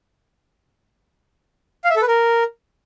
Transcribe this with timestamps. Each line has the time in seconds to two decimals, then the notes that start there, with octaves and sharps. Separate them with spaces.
1.84 F5
1.90 E5
1.96 A4
2.02 B4
2.08 A#4